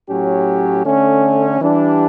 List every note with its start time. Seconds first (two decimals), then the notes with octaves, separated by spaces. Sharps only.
0.08 A2 F#3 C#4 G4
0.84 D3 A3 C#4
1.60 E3 G3 D4 G4